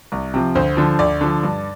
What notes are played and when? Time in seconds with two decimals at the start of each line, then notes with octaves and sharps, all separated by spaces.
0.12 C2
0.34 C3 F3
0.55 D2 C5
0.77 D3 F3
0.99 D2 D5
1.21 D3 F3
1.43 G2